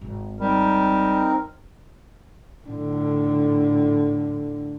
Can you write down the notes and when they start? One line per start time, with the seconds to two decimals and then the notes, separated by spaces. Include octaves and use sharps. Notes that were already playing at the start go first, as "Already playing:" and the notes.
0.01 G#1
0.40 G3 C4 D#4 A#4
2.65 A2 D3